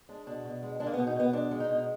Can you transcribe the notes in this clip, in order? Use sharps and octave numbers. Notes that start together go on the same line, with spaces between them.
G#3 D4
B2 D4
B2
G#3
G#3 D4
A#3
B3
B2
D#4
B2 B3
G#3 D4
G#3
D#4
B2